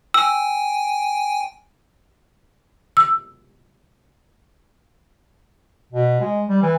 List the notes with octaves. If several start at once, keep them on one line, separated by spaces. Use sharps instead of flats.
G5 G#5 E6
E6
B2
G#3
G3
E3